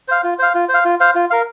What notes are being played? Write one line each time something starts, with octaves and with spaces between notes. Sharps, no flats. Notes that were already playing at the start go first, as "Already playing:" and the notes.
C5 F5
F4
C5 F5
F4
C5 F5
F4
C5 F5
F4
A#4 F5